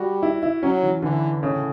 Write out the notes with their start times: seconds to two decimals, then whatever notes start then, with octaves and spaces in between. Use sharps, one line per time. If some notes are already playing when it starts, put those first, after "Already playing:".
Already playing: G3 F#4
0.23 E4
0.43 E4
0.63 F#3 C#4
0.83 E3
1.02 D3 E3
1.42 A2 C#3